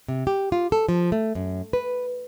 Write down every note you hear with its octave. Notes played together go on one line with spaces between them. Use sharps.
C3
G4
F4
A4
F3
A3
F#2
B4